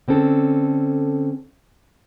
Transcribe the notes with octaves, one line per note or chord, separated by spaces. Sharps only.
D3 C4 C#4 A4